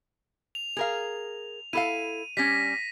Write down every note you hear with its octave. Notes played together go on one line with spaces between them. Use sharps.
F7
G#4 A#4 F5
E4 A4 F5 D#7
G3 C#4 A#6 B6